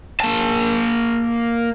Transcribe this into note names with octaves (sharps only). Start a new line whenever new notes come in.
A#3 A5